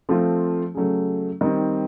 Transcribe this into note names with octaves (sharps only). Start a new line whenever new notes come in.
F3 A3 C4 F4
C#3 F#3 A3
D#3 G3 C4